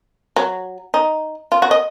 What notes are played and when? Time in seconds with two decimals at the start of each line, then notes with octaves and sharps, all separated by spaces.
0.36 F#3
0.94 D#4
1.52 F4
1.62 F#4
1.71 D#5